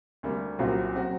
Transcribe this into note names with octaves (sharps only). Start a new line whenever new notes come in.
D2 C3 G3 A#3
C2 A#2 F#3 C4 F#4
F#3 C4 F#4